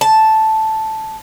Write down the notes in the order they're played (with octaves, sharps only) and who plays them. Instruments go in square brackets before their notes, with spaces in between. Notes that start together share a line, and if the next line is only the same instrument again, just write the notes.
[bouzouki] A5